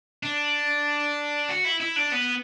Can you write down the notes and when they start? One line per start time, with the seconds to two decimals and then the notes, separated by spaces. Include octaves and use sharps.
0.23 D4
1.49 F#4
1.65 E4
1.81 E4
1.96 D4
2.12 B3